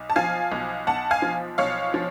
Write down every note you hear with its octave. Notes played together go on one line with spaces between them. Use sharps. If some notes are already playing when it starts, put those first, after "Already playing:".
Already playing: B1
A5
F3 F5 G#5
B1
B1 F#5 A5
F5 G#5
F3
B1 C#5 F5
F3